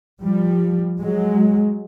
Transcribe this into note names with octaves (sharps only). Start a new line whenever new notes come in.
F3 G3
F#3 G#3